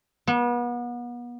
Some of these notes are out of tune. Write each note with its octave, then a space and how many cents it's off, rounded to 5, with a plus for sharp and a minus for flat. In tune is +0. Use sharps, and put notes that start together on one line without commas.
B3 -35